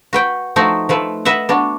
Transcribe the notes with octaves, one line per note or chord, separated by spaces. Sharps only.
F#4 B4 G5
F3 A3 D#4 F#4
F3 A3 B4
B4 D#5 E5 F#5
B3 D4 F#4